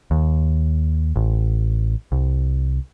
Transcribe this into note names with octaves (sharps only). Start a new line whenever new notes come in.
D#2
A1
C2